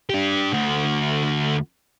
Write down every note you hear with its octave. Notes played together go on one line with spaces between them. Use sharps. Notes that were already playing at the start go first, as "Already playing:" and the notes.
D4 G4
D2 F#4